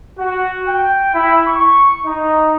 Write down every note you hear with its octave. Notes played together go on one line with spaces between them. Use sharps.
F#4
G5
E4
C#6
D#4